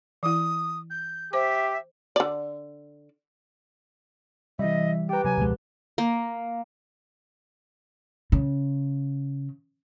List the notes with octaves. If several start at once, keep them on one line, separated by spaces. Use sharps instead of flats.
E3 E4 D#6
G6
G4 C5 E5 D6
D3 D5
C3 E3 G3 D#5 E5
G4 B4 G5 A#5 D6
C3 F#3 G#5
E1 C#2 B2 F3 G#3
A#3
C#3